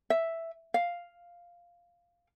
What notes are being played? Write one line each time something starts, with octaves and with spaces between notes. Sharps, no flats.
E5
F5